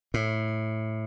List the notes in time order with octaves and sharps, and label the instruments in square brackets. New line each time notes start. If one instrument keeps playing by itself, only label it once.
[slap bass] A2